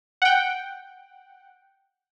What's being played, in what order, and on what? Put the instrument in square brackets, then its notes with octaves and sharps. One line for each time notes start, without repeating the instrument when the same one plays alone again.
[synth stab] F#5 G5